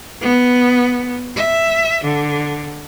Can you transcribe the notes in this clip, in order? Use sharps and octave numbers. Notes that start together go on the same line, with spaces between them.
B3
E5
D3